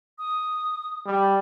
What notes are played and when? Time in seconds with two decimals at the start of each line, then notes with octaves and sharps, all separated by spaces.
0.19 D#6
1.06 G3